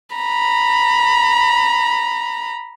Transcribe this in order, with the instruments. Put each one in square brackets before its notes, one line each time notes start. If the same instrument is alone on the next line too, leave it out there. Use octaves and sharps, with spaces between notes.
[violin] A#5 B5